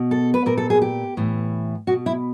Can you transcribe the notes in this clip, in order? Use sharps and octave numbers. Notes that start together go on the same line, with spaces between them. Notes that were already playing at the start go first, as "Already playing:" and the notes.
Already playing: B2
A4
B4
A#2 A#4
A4
G#4
G4
A2 E3
B2 F#4
E4